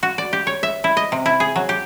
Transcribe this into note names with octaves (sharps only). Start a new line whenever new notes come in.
F#4
D5
G4
C#5
E5
E4
D#5
C3
E4
G#4
F#3
G4